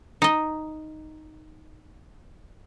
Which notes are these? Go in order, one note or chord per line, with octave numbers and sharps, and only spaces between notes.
D#4 D#5